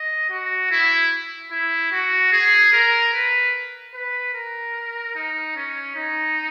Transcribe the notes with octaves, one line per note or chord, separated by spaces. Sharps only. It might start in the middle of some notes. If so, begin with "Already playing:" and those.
Already playing: D#5
F#4
E4
E4
F#4
G#4
A#4
B4
B4
A#4
D#4
C#4
D#4